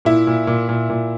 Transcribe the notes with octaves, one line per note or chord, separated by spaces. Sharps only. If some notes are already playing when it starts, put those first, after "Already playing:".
A#2 E4
A#2
A#2
A#2
A#2